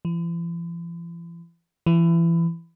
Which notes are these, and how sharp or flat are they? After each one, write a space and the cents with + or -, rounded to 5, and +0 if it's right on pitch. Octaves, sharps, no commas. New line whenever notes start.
E3 +45
E3 +25